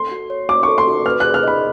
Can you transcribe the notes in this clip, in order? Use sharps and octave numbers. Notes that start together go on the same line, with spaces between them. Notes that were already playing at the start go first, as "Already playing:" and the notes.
Already playing: A4 C6
F#4
C#5
F#4 D6
C#6
A4
C6
F#4
B4 F6
F#6
G#4
F6
D#5 B5